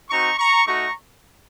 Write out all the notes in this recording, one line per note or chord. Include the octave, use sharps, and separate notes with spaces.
C4 D#4 F#4 A#5 C#6
A#5 C#6
A3 D#4 F#4 A#5 C#6